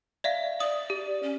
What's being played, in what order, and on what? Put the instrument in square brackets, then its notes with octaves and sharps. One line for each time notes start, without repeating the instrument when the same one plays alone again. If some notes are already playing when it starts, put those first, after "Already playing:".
[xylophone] D5 E5 F5
[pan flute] D5 [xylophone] D#6
[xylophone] G4
[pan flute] C#4